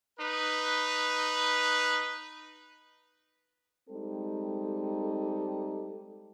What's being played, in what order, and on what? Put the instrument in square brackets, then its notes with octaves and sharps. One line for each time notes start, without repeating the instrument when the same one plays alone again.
[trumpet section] D#4 B4
[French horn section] G3 G#3 C4 D#4 A4